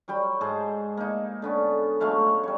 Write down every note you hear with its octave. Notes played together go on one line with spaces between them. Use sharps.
F#3 G3 G5 B5
G#2 G#4 C5 A5
A#3 D#4
D3 B3 C#4
F#3 G#3 A3 F5
G3 C#5